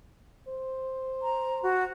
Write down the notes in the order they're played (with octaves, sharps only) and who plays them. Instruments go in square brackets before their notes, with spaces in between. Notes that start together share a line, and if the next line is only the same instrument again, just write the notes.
[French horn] C5
[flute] A#5
F#4